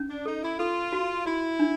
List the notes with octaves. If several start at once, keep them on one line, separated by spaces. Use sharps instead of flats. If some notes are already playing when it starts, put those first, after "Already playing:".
Already playing: C#4
D4
D#4 A4
E4
F4 A4
F#4
E4 F#4
D4